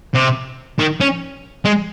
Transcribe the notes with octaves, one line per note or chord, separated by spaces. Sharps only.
C3
D#3
C#4
G#3